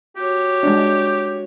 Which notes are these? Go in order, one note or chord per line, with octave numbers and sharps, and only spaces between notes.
F#4 G4 C#5
G#3 D4